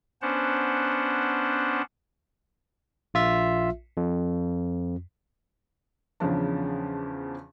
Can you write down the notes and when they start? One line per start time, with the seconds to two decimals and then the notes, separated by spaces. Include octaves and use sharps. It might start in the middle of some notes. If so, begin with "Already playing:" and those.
0.22 B3 C#4 D4 C5 F#5 A5
3.14 A#1 F4 E5
3.97 F2
6.20 E2 C#3 F3 D4